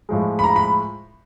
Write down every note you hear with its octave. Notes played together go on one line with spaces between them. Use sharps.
A2 F3 G#3
B5
A#5
B5